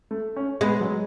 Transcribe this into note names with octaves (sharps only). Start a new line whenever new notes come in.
A3
C#4
G#3 B3
F#3